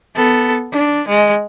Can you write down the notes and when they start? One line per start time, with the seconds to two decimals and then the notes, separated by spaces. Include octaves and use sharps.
0.15 B3 A4
0.72 D4
1.08 G#3